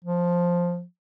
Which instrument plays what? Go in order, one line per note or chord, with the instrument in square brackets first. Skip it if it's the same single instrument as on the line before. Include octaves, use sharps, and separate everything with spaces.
[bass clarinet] F3